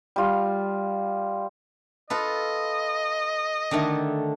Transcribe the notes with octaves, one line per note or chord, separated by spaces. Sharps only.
G3 F4
F4 A4 B4 D#5
D3 D#3 A3